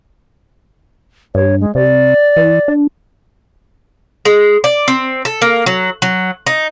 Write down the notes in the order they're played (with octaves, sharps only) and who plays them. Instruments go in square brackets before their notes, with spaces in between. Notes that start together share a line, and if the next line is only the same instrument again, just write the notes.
[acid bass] G2 [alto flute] C#5
[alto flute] G#3
[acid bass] C3 [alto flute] D5
[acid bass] E3
D4
[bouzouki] G#3
D5
C4
A4
A#3
F#3
F#3
D#4